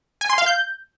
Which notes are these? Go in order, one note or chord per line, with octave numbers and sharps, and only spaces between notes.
G#5
C6
F5
G6